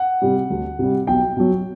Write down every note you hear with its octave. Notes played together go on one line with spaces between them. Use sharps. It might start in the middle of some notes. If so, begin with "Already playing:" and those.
Already playing: F#5
C3 G3
D2
C3 G3
B1 G5
B2 F#3